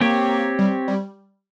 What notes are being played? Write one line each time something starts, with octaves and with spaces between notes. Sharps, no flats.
A#3 C4 G4 C#5
G3
G3